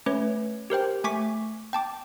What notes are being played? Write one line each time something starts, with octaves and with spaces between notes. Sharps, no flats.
A3 C#4 B4 C#5
G4 A#4 C5 G5
A3 G#5 C#6 D6 B6
G5 A5 D6